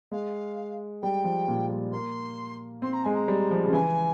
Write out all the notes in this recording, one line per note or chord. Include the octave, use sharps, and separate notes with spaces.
G#3 F5
G3 G5
F3
A#2
G3
A#3 C6
C4 C6
A#5
G#3 G#5
A#5
G3
F3
C#3
E3 G#5